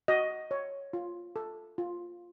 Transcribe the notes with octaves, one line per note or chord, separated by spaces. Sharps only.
F#4 D#5
C#5
F4
A4
F4